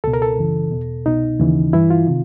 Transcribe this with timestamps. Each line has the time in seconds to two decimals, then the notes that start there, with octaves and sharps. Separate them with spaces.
0.04 C#2 B2 A4
0.14 A#4
0.22 A4
0.38 F#2 C#3 E3
0.71 E2 B2
1.06 C2 B2 D#4
1.40 D#2 C#3 E3
1.73 G2 E3 E4
1.90 F4
2.07 C3 D#3